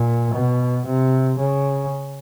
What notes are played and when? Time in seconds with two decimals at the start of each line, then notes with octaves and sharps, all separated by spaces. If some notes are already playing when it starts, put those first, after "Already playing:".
Already playing: A#2
0.34 B2
0.86 C3
1.39 C#3